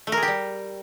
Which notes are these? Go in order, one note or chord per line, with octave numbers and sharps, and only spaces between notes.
A3
A#4
G#4
G4
G3